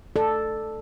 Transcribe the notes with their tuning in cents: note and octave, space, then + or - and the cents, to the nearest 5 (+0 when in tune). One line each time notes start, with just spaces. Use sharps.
A4 +0 D5 +30